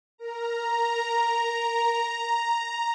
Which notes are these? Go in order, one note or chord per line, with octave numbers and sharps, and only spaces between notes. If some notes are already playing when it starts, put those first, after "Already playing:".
A#4 A#5